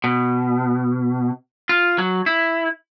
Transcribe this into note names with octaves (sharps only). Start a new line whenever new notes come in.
B2
F4
F#3
E4